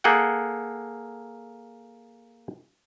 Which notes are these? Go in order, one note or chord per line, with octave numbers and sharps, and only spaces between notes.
A#3 G#4 A4 F#5 G5